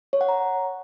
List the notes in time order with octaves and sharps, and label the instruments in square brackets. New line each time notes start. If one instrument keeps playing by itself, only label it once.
[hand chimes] C#5
F#5
A#5